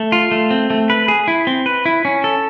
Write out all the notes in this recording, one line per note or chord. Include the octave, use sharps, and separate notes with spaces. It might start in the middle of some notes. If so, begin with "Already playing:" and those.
Already playing: A3
F4
A3
C4
A3
B4
G#4
E4
C4
B4
E4
C#4
A4